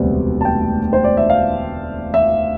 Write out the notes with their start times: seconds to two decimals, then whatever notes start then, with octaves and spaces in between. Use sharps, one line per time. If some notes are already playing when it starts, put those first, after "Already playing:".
Already playing: E1 D2 C3 G3 B3 C5 D5
0.41 A5
0.45 G5
0.93 C5
1.04 D5
1.17 E5
1.30 F5
2.14 E5